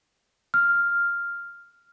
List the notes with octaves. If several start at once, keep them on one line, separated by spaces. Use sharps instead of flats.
F6